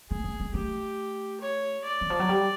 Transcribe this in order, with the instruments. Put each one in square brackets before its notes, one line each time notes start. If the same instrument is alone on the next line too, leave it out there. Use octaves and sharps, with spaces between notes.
[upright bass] A3 [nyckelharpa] G#4
[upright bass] A3
G#3
[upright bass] A3 [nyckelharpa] G4
[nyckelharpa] C#5
D5
[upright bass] E3
F3
F#3
G3